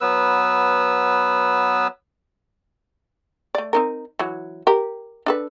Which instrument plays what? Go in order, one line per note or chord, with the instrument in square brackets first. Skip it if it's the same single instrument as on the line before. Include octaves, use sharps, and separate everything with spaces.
[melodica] F#3 B3 B4 E6
[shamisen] A3 D5
C4 D#4 A#4
E3 F#3
G4 A#4
D4 A4 B4